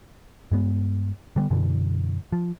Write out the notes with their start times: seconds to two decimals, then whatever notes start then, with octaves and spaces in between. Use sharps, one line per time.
0.52 G2 G#3 B3
1.36 D3 G3 G#3 B3
1.50 F#2 B2 D3 E3
2.32 F3